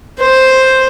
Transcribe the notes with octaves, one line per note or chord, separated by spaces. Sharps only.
C5